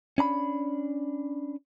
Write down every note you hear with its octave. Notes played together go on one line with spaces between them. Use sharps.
C#4 D4 A#5 B5